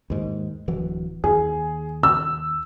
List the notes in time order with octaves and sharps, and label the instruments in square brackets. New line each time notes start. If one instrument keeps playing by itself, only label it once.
[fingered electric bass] D#2 G#2
D1 E3 F#3
[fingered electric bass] D#2 [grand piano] G#4
[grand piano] E6